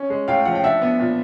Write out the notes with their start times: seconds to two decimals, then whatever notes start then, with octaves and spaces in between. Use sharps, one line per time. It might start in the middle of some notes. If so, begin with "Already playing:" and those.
Already playing: C#4
0.10 G#3
0.28 A2 F5 G5
0.46 F3 F#5
0.55 G5
0.63 D4 E5 F#5
0.81 B3
0.99 A#2